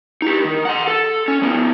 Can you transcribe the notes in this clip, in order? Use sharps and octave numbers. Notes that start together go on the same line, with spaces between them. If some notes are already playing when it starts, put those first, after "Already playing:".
D#4 G4
D#3
F#5 C6
A4
C#4
F3 B3